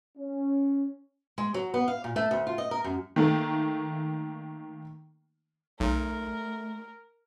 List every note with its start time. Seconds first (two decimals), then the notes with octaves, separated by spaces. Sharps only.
0.18 C#4
1.38 G#3
1.54 F#3
1.74 B3
1.88 F5
2.04 A#2
2.16 A3
2.31 D2
2.47 F4
2.58 D#5
2.71 A#4
2.84 F#2
3.16 D#3 A3 A#3
5.80 B1 A3 A#4